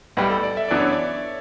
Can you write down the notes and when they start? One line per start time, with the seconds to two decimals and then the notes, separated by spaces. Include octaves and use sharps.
0.17 B1 A2 G3 B4
0.30 A4
0.43 D5
0.57 E5
0.69 F#2 E3 B3 D4 D5
0.80 C#5
0.92 D5